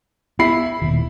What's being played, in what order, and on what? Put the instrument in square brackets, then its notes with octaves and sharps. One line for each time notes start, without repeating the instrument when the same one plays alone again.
[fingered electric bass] B3 [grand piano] E4 B5 C7
[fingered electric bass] D#1 D#2 B2